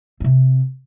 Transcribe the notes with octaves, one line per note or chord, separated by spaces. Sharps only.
C3 C4